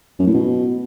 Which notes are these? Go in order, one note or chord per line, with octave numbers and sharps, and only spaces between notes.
F#2
A2
B2